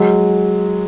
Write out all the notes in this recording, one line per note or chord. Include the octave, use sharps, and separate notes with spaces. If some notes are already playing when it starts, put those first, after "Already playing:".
Already playing: F#3 G#3